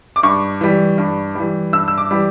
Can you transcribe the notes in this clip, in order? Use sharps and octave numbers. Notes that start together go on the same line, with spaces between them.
D6
G2 C#6
E3 G3
G2
E3 G3
G2 E6
E6
D6
E3 G3